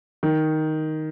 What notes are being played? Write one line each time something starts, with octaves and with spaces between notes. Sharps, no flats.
D#3